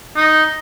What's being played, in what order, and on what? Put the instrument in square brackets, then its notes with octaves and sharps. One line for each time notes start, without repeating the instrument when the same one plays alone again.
[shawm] D#4